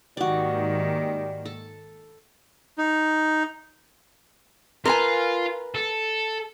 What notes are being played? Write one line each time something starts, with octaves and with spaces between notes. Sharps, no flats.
G#2 D#3 G3 A#3 F#4 D5
A4
D#4
F4 A#4 B4 G#5
A4